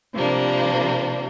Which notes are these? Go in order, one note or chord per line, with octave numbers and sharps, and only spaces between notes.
C3 F3 G3 A#3 D4